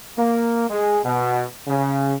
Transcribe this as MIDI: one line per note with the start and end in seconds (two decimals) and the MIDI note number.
0.18 0.66 58
0.70 0.99 56
1.05 1.44 47
1.68 2.15 49